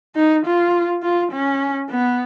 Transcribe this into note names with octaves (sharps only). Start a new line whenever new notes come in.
D#4
F4
F4
C#4
B3